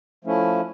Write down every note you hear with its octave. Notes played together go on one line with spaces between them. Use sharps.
F3 A3 C#4 E4